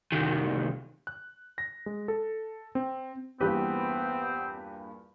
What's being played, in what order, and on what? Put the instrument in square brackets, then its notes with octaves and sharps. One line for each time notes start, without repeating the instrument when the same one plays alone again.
[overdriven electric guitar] C2 D#3
[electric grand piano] F#6
A#6
G#3
A4
C4
[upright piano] E2 G2 A#2 [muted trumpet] B3 [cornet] C4 [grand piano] G4 B4